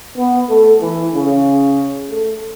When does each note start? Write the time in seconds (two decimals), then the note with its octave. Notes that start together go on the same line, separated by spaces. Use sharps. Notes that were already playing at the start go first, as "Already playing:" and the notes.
0.18 B3
0.49 A3
0.82 E3
1.14 C#3
2.10 A3